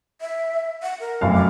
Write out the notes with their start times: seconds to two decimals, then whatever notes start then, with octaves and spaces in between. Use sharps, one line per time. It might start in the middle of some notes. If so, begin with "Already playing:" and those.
0.21 E5
0.83 F#5
1.00 A#4
1.21 F1 F#2 F5
1.34 D6